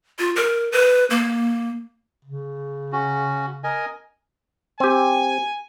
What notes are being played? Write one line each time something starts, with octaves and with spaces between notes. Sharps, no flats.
F4
A#4
B4
A#3
C#3
C#4 F#4
A#4 D#5 G#5
C4 G4 G#5